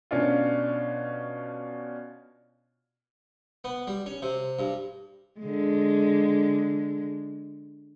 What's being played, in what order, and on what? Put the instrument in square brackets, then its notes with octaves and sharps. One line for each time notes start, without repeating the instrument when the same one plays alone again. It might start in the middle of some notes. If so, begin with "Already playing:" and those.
[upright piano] B2 C#4 D4 F4
[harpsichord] B3
G3
C#4
C3
G2
[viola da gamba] D3 G#3